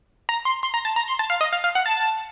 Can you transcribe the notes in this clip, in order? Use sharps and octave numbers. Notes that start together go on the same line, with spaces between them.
A#5
C6
C6
A#5
A5
A#5
C6
A5
F5
D#5
F5
F5
F#5
A5